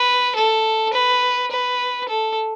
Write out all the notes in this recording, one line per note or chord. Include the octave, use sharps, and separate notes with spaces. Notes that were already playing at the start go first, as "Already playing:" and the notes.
Already playing: B4
A4
B4
B4
A4